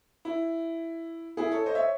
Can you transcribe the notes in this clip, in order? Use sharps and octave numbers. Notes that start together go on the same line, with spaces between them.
E4
E4 G#4
A4 C#5
C5 D#5
C#5 E5